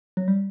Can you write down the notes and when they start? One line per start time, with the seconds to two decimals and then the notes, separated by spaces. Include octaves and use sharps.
0.17 F#3
0.28 G3